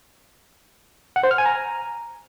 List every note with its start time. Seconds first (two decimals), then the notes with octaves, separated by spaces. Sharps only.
1.16 F#5
1.23 C5
1.31 F6
1.38 G#5
1.46 A#5